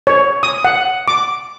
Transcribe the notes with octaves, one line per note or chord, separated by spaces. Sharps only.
C#5
D#6
F#5
D6